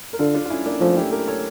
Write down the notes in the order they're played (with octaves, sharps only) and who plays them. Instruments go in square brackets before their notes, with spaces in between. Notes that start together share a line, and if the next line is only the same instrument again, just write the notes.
[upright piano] A#4
[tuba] D3 [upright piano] F4 A4
[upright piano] D4 F4
F4
C#4 E4
A#3 D4
[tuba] F3 [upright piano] A3 C#4
[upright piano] E4 G4
G4 A#4
A4 C#5